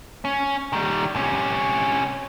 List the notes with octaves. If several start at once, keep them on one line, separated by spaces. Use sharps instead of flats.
C#4
D#3 G3
C3 C#4